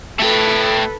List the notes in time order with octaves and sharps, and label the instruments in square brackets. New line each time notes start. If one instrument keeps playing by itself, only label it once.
[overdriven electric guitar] A3 G5 [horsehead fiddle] A4 B4